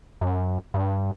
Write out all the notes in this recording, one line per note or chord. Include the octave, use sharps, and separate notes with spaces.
F#2
G2